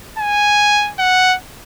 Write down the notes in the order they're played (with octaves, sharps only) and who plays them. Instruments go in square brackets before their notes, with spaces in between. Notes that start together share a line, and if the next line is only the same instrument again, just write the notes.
[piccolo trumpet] G#5
F#5